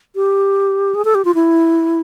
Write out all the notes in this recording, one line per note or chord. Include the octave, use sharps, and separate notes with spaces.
G4
G#4
A4
G4
F4
E4